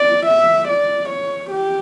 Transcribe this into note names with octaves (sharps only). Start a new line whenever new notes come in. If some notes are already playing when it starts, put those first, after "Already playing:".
Already playing: D5
E5
D5
C#5
G4